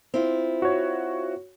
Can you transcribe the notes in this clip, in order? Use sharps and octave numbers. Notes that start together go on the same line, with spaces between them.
C4 E4 F4
F#4 C#5